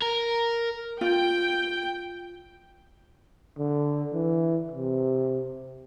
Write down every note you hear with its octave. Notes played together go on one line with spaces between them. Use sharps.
A#4
F4 G5
D3
E3
C3